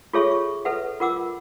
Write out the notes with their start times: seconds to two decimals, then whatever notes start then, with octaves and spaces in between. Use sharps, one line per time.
0.13 F4 G#4 A4 C#5 E5 C#6
0.31 C#6
0.65 A4 B4 E5 F#5
1.00 F4 A#4 F#5 D6 E6